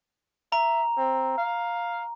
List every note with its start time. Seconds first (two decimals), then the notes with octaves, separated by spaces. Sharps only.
0.52 E5 A#5
0.97 C4
1.38 F5